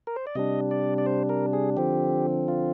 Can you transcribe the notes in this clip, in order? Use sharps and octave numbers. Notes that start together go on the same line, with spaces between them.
A#4
C5
D5
C3 G3 D4 D#5
D5
D5
C5
A#4
G#4
D3 F3 C4 G4
F4